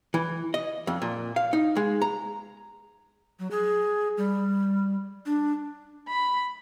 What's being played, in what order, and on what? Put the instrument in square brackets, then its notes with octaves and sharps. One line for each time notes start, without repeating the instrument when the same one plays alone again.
[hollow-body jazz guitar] E3
D#5
F2
A#2
F5
D#4
G#3
A#5
[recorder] F#3
G#4
G3
D4
[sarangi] B5